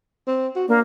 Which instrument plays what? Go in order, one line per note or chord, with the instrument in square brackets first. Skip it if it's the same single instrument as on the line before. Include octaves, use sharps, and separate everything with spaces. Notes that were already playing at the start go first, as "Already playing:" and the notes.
[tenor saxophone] C4
F#4
[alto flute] A#3 [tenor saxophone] D4